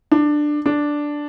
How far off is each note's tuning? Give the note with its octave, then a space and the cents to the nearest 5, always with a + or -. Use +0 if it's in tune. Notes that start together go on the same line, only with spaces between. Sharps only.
D4 +15
D4 +0